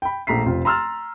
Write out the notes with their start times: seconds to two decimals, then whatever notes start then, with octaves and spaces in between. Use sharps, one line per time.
0.02 G5 B5
0.27 A#1 A3 A#5 B6 C7
0.45 F1 C4 F4
0.65 A#5 C6 E6 F6 A6